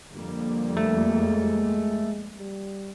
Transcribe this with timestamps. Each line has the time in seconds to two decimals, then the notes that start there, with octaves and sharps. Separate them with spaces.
0.12 F2 D3 G3 A#3
0.77 A3
1.14 G#3
2.38 G3